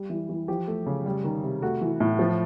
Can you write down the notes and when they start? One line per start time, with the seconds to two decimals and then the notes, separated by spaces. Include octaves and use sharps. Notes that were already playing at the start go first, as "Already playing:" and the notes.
Already playing: G3
0.10 E3
0.29 E3
0.48 F3 G4
0.67 A3
0.86 C#3
1.06 G3
1.24 D#3
1.43 C3
1.62 A3 F#4
1.81 E3
2.00 A2
2.19 F3